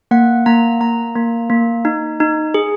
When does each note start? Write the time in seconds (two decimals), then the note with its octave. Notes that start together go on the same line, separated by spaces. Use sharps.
0.11 A#3 F#5
0.46 A#3 A#5
0.81 A#3 A#5
1.16 A#3
1.50 A#3
1.85 D#4
2.20 D#4
2.54 G#4